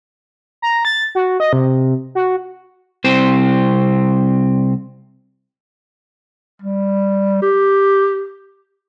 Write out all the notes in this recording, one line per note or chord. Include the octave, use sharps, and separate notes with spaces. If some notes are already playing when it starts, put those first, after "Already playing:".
A#5
A6
F#4
D#5
C3
F#4
C2 C4 C5
G3
G4